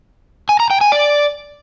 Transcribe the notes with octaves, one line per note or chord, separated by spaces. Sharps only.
G#5
A#5
G5
G#5
D5